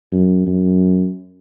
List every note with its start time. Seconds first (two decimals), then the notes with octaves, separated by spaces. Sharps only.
0.12 F#2
0.47 F#2